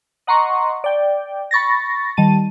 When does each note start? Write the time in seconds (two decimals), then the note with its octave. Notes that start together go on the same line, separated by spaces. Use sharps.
0.27 D#5 F#5 A#5 C6 C#6
0.84 D5 G5
1.51 B5 C#6 A6 A#6
2.17 D#3 G3 A5 D#7